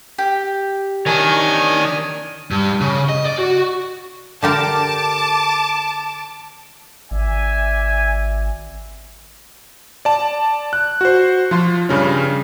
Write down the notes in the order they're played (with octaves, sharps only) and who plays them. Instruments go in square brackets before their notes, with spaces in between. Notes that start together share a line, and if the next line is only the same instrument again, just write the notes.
[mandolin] G4
[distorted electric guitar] D#3 [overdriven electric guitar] D4 C#5 [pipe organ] G#5
[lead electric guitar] G2
C#3
D#5
D5
F#4
[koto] D3 G4 A#4 [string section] A5 D6
[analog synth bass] G#1 [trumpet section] D5 E5 G#5
[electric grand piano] D5 A5
F#6
F#4 C5
F3 F4 C6
G2 C#3 C#4